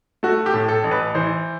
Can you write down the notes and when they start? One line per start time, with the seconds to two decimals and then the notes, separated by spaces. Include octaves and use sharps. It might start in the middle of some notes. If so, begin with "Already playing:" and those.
0.23 A3 F#4
0.46 G4
0.54 A2
0.68 A4
0.84 A1
0.91 B4
1.15 E3 C5